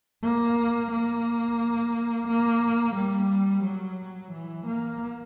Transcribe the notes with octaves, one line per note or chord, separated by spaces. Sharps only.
A#3
A#3
A#3
G3
F#3
E3
A#3